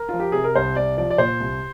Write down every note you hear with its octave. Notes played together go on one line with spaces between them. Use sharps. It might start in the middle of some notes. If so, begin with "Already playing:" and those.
Already playing: A#4
F3 F4
G4
C3 G#4
A#4
C2 C5
C2 D5
F3 D5
D5
A#2 C5
C2